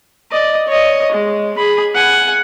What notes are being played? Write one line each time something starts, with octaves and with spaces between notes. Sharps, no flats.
D5 D#5
C#5 D#5
G#3
G#4 B5
F#5 G#5